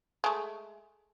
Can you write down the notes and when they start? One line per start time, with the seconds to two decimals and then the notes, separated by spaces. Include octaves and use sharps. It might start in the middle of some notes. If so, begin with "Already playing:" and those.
0.24 G#3 A3